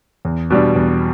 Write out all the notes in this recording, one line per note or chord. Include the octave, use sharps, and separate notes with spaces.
E2
B2 G3 D4
E2